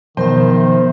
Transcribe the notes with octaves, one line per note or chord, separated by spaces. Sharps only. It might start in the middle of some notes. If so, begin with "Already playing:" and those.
B2 D#3 F3 F#3 B3 A#4 C5 E5